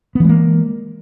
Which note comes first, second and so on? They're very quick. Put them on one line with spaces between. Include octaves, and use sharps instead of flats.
B3 E3 G#3 A#3